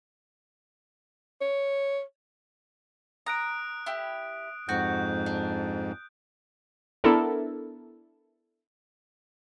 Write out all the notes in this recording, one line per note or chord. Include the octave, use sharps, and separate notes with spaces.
C#5
A#5 D#6 F#6 D7
E4 G4
F2 G#2 F#4 G6
D4
B3 D4 E4 A4 A#4